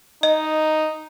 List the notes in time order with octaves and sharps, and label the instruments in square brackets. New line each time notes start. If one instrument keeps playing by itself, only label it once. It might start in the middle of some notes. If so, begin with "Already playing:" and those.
[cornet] D#4 [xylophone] D#5